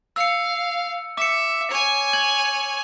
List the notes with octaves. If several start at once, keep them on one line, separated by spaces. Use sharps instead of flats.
F5 E6 C#7
E5 D6 C#7
C#5 G#5
G#6 F#7